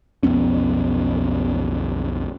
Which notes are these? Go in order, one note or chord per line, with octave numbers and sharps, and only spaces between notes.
B1 F2 B3 C#4